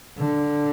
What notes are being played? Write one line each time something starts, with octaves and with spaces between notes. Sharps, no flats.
D3